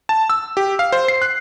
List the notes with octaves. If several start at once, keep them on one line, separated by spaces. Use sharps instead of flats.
A5
E6
G4
F5
C5
C7
F#6